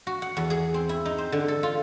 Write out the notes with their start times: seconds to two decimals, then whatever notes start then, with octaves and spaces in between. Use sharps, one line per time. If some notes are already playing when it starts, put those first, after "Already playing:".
0.07 F#4
0.22 F#5
0.37 E2
0.50 G#4
0.74 C4
0.89 E4
1.05 D#4
1.18 C5
1.32 D3
1.48 A4
1.63 F4